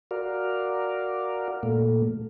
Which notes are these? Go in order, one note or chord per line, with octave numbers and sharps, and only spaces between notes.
F#4 A#4 D5 F5
A#2 A3